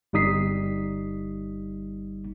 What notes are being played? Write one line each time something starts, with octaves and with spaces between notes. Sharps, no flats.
G1 G3 D#4 D#6 B6 C7